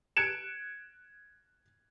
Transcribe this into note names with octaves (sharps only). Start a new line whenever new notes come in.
F#6 G#6 C#7 D7 E7